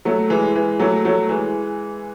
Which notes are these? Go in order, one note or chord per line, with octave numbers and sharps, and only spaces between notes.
F#3 A3
E3 G#3
E3 G#3
F#3 A3
F#3 A3
E3 G#3